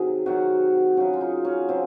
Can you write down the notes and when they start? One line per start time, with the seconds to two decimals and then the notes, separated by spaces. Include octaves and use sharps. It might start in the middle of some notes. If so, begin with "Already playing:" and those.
Already playing: C3 D#3 F#3 G#4
0.26 C3 D#3 F#3 F#4
0.97 C#3 F#3 F#4
1.13 F4
1.21 D#4
1.45 C#4
1.69 C#3 F#3 C4